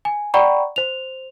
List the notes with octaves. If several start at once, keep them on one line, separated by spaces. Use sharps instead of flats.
G#5
D5 F#5 G5 A#5 B5 C#6
C5 F7